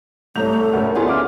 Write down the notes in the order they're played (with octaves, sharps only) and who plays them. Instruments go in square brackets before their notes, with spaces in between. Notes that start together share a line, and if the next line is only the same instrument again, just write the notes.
[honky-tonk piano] C2 F7 [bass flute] A3 [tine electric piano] C#5 A#5 G6
[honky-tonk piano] D2 C#4 [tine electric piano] A4 A#4 F#5
[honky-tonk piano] B3 F4 G#4 [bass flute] E4 [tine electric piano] D5 G#5 C6
[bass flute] C#4 [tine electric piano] E5 D6 F6